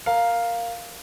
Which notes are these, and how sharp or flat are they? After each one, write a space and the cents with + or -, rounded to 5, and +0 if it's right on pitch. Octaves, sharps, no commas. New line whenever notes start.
A#4 +0 F5 +0